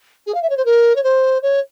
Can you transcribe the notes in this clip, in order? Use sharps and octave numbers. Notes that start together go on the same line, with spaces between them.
G#4
F5
E5
C#5
C5
A#4
C#5
C5
C#5